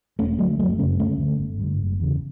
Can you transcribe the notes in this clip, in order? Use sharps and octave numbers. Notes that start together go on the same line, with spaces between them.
E1 A3 C#4
D2 D3 F#3 A3
F#1 F#3 A3
F#2 C#3 A3 C#4
D2 A3 C#4
D3
G1
G2 D3
F#1
E2 C#3